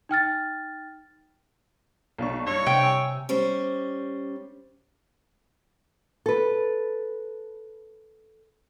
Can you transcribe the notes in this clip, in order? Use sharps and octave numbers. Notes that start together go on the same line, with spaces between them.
D#4 G5 F6 A6
B1 D4 C#6
G2 E4 C#5
C3 G5
G#5 E6
G3 C#4 C5
A4 B4